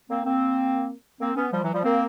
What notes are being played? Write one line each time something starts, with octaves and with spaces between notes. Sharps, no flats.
A#3 C4
A#3 C4
A#3 C4
B3 C#4
F3 G3
E3 F#3
F3 G3
A#3 C4